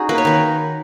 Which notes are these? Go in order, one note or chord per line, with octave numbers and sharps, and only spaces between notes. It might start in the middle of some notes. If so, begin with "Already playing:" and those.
Already playing: C#4 D#4 F#4 G#4
A#3 B4
C#5
D#3 B4